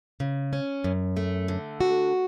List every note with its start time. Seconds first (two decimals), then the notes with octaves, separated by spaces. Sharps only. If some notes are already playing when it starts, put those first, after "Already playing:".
0.20 C#3
0.53 C#4
0.84 F#2
1.17 A3
1.48 D3
1.81 F#4